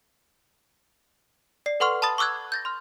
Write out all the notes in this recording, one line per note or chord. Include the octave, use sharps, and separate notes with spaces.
D5 C7
A4 B4 F#5 C6 C#6 F6
A5 B5 C#6 D#6 A6
C#6 D6 E6 F#6 G#6
G6 A6 A#6
C6 F6